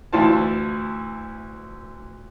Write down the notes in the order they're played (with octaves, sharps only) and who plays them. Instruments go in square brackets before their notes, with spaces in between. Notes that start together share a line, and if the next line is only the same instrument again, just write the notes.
[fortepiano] D2 E3 F4 C5 A5